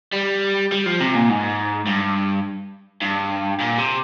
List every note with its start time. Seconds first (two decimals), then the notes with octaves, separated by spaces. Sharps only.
0.13 G3
0.72 G3
0.86 F3
1.00 C3
1.15 A#2
1.29 G#2
1.87 G2
3.02 G2
3.60 A#2
3.78 C3